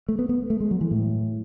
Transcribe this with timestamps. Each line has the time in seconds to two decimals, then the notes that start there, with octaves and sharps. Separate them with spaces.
0.09 A3
0.19 B3
0.29 B3
0.50 A3
0.61 G#3
0.71 F#3
0.81 E3
0.91 A2